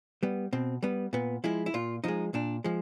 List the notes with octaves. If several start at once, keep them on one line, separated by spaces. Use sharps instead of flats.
G3 B3
B2 C4
G3 B3
A#2 B3
F3 G#3 E4
E4
A#2 F4
F3 G#3 D#4
A#2 D4
F3 G#3